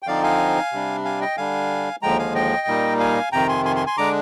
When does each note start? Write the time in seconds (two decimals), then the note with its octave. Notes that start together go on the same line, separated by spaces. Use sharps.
0.02 G5
0.07 D3 F3 C4 D#4 D5 F5
0.23 F5 G#5
0.72 C3 G3 D4
1.05 F5 G#5
1.21 D#5 G5
1.37 D3 G3 D4 F5 G#5
2.02 D#2 D3 F3 G#3 G5 A#5
2.19 F5 G#5
2.35 D#5 G5
2.67 A#2 G3 A#3 D#4
2.99 F5 G#5
3.32 F2 C3 D#3 G5 A#5
3.49 G#5 C6
3.65 G#5 C6
3.76 G#5 C6
3.86 G#5 C6
3.97 D3 G#3 D4 A#5 D6